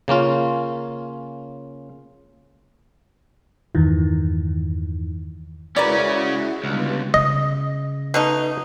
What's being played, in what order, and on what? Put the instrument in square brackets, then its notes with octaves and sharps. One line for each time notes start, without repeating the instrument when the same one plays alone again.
[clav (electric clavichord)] C#3 A#3 C#4 F4
[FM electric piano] E2 G2 D#3 E3
[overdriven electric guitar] C#3 C#4 [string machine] G#3 E4 F#4 [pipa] A#4 B4 D5
[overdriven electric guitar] C#2 [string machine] D3 G3 B3
[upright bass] C#3 [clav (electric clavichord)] D#5
[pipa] B2 A3 D#4